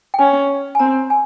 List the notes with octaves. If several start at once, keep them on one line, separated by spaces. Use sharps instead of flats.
G5
C#4 G#5
G#5
C4 A#5
G#5